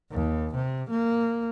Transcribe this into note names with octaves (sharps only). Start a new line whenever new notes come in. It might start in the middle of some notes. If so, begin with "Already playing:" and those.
D#2
C3
A#3